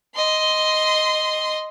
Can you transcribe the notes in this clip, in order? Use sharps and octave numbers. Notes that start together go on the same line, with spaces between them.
D#5 C6